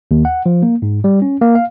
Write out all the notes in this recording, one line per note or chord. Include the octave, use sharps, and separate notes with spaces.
D#2
F#5
F3
A#3
G#2
G3
C#4
A#3
F5